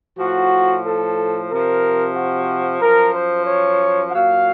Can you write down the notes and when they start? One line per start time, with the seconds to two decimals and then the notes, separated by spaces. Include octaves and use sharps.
0.18 A2 F3 F#4
0.84 A4
1.50 C3 F3 A#4
2.16 F#4
2.80 F#2 F3 A#4
3.13 C5
3.46 C#5
4.12 A#2 F#3 F5